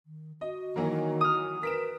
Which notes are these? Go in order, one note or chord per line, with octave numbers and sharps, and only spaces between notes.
D#3
F#4 D#5
D#3 E3 F#3 A#3
D#6 F6
A#4 B4 B6 D7 E7